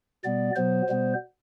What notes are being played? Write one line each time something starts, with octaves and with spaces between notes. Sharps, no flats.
B2 G3 B3 D5
B2 F#3 B3 C5
B2 G3 B3